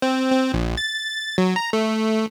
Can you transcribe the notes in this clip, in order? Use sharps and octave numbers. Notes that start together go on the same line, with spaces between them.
C4
C4
A#1
A6
F#3
A#5
A3